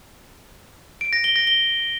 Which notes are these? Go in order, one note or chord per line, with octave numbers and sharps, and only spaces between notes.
D7
A#6
G7
A#6
G7